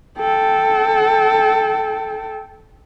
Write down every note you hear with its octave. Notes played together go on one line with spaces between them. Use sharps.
A4 G5